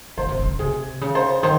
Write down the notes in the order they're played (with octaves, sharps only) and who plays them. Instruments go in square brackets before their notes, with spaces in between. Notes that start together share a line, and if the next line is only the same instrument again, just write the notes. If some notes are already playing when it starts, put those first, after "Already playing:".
[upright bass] C#3 [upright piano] C5
[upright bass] C3
C#3
[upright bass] C3 [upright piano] G#4
[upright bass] C#3
[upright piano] C5
[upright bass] D#3 [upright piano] C5